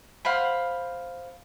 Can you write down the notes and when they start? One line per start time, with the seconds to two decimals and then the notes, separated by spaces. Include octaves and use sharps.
0.25 C5 F5 F#5 B5